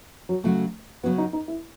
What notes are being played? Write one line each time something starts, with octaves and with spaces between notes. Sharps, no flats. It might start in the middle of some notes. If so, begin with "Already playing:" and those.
F#3
C#3 F#3 A3 C#4 F#4
C#3 F#3 B3 C#4 F#4
D#4
D#4
E4